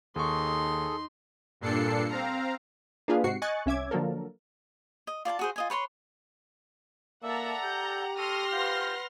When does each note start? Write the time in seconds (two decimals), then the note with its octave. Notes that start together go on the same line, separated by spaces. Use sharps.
0.16 D#2 D#4 G#4 A4 C6 C#6
1.61 G2 A#2 D4 A4 C7 C#7
2.09 C4 F5 A#5
3.08 A#3 D4 F4 G#4 B4 F5
3.24 G#2 C3 F#4 C7 C#7
3.42 D#5 G#5 C#6 F#6 A6 C#7
3.66 C2 C#4 E5 D6 G#6
3.91 D3 F3 F#3 A#3 A4 A#4
5.07 D#5
5.25 F4 D5 G#5 A5
5.39 F#4 G#4 C5
5.56 F4 D#5 G#5
5.70 B4 C#5 A#5 C6
7.23 A#3 A4 D5 E5 F#5 A5 A#5
7.64 G4 G6
8.18 A4 C6 C#6 F6 A#6 D#7
8.52 F4 B4 C5 F5 F#5